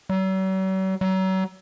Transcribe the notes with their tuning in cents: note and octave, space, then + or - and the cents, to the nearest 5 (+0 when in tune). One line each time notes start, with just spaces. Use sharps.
F#3 +45
F#3 +35